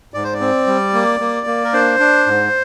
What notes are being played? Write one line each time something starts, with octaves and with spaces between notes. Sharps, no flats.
G#2 D5
C5
D5
C4
G3
A#3
A#3
A#3
A#4
D4 C5
D4
G#2